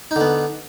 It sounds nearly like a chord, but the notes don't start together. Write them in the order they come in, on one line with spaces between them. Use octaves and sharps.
D#4 D3 B3